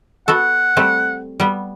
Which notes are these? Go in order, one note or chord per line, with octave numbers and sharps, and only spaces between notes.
B3 F#4 A4 F#5
G3 A3 C4
G3 B3